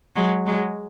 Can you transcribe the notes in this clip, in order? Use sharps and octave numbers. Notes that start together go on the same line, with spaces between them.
F#3 G#3
F#3 G#3